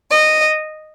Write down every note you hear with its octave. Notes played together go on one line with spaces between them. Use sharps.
D#5